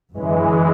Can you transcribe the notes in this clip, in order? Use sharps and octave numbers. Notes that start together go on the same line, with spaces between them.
F#2 D3 E3 F#3 G#3 C#4